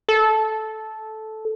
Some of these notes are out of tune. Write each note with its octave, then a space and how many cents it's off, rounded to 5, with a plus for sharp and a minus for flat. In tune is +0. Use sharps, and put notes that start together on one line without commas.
A4 -10